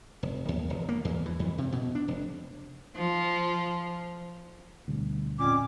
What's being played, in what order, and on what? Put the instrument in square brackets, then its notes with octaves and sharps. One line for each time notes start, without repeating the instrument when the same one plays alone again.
[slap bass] F1
D#2
E1
A#3
E2
E3
F2
C3
B2
D4
F1
[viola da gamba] F3
[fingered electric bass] D2 B2 G3
[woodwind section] F2 A#2 C#4 [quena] D6